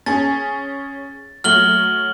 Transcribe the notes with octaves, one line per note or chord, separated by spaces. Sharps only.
C#4 G#4 A6
F#3 A3 F6 F#7 G7